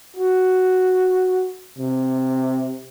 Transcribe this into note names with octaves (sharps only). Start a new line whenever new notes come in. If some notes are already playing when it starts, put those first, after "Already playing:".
F#4
C3